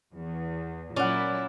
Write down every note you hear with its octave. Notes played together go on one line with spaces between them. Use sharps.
E2
A#2 F#3 C#4 E4 D5 F#5